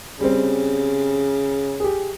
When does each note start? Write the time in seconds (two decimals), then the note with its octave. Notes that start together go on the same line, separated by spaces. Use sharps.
0.21 C#3 G3 C4
1.80 G4 G#4